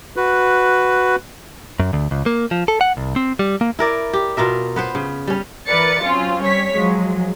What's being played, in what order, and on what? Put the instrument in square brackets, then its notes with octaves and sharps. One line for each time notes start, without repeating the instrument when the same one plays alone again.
[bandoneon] F#4 B4
[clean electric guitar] F#2
D2
C#2
A#3
F3
A4
F#5
C2
C4
G3
A#3
[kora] E4 A#4 D5
G4
B2 F4 A#4 E5
B3 B4 C5
C#3
G3 C#4
[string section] E3 A#4 B4 D5 A6 C#7
F#3 C4 C#4 F4
G3 C#5 B6
F3 F#3 G#3